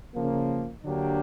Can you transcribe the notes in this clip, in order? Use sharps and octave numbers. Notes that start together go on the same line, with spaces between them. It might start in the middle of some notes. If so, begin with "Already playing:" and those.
C#3 F3 A#3
D3 F#3 A#3 D4 G4